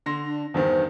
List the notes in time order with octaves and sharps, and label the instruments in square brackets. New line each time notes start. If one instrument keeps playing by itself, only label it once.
[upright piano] D3 C6 A#6
[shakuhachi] D4
[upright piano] E2 G2 D#3 [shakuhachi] C5